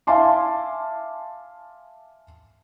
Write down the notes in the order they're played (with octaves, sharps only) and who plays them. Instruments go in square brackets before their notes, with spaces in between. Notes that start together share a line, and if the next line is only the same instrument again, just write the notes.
[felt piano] E5 F5 G#5 A5 C6 D6